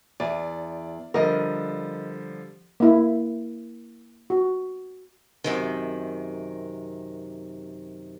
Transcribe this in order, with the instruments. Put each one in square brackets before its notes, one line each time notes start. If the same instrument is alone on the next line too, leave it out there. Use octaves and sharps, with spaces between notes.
[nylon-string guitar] E2 [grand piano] D5
[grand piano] D3 F3 G3 [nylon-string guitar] A#4 D#5
[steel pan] A#3 E4
F#4
[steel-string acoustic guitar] F#2 C3 D#3